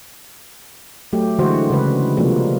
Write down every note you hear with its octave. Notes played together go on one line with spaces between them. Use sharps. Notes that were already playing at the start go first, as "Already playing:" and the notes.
F#3 A3 G4
D3 E3 G#3 F#4 C5
C#3 G#3 B4
C3 F3 G3 G#3 A#3